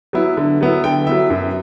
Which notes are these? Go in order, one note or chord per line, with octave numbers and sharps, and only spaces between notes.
F#3 B3 E4
D3
F#3 B3 E4
D3 G5
F#3 B3 E4 E5
F#2